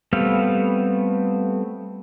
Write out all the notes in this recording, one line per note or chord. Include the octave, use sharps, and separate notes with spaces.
G3 A3 B3 C4 F5